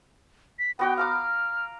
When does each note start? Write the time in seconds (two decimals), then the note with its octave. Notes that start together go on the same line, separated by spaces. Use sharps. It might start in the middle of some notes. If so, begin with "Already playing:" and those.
0.59 B6
0.79 B3 F#4 G5 D6
0.97 F5 A#5 D6 F6